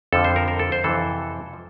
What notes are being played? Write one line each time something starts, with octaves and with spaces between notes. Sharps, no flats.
F2 D3 F3 A4
C5
A#4
A#4
A4
C5
F2 C3 E3 A4
F3